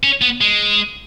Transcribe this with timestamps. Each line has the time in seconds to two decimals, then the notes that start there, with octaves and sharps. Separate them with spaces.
0.04 C#4
0.22 B3
0.41 G#3